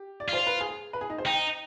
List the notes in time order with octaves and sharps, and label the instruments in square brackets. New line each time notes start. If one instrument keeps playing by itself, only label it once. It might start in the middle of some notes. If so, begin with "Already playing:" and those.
Already playing: [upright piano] G4
D5
[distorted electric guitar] F4 [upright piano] C5
[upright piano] B4
G#4
B4
G#4
D#4
C5
[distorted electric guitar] D#4 [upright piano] G5